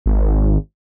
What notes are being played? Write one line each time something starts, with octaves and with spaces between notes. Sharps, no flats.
G#1